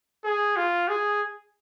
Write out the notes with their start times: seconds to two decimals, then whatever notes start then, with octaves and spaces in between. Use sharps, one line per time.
0.24 G#4
0.56 F4
0.88 G#4